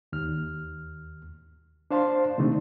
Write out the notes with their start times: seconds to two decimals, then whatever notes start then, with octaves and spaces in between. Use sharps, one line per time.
0.13 D#2 F6
1.91 D4 C5 F5 A5 C6
2.38 C3 D#3 A3 C4 D4 D#4